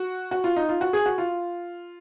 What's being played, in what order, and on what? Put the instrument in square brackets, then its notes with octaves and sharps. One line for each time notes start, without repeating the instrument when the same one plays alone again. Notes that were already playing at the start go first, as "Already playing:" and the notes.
Already playing: [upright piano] F#4
F#4
F4
D#4
F4
F#4
G#4
F#4
F4